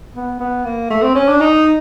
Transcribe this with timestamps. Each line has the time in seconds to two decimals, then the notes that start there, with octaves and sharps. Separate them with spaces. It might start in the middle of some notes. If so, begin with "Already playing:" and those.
0.15 B3
0.40 B3
0.65 A#3
0.90 A3
1.02 C4
1.15 C#4
1.28 D4
1.40 D#4